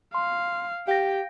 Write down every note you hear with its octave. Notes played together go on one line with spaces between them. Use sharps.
F5 C6
G4 F5 G5 A#6